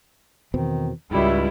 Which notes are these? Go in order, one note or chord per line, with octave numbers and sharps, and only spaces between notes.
E2 B2 D#3 C4
C#2 G#2 C#3 G3 E4 F#4